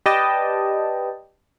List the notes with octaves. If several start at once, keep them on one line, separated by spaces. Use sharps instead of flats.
G4 B4 D5 D#5 G5 A5